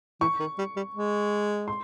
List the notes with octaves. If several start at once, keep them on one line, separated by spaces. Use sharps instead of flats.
E3 C#6
D#3
G3
G3
G#3
C6